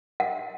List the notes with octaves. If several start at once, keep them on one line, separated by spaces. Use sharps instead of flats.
F#5